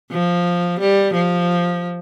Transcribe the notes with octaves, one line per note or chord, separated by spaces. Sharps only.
F3
G3
F3